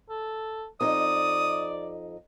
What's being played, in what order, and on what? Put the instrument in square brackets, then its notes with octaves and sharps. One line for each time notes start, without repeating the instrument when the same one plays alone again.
[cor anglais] A4
[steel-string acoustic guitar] F2 D#4 D#5 [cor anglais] D5 [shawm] D#6